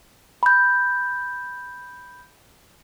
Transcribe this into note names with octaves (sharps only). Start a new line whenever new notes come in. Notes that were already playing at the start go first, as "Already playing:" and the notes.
B5 G6